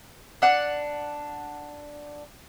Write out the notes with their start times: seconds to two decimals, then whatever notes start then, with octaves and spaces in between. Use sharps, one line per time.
0.42 D4 F#5